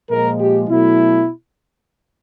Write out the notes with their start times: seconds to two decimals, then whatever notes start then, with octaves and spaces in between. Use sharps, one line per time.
0.10 A#2 F3 G#3 A#4
0.40 G4
0.69 B2 F#3 A3 E4